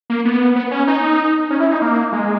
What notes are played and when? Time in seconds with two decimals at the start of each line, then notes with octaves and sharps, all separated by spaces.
0.10 A#3
0.25 B3
0.56 B3
0.71 C#4
0.87 D#4
1.50 C#4
1.60 E4
1.71 D#4
1.82 A#3
2.12 G#3